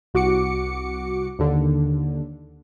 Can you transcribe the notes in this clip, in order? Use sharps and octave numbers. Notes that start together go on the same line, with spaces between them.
C2 F#4 D6 C#7
D#2 D3